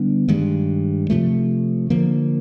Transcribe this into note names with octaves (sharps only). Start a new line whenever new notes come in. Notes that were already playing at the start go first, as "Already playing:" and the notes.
Already playing: D3 G3 B3 D4
G2 D#3 G#3
C3 F3 A3
D3 F3 A#3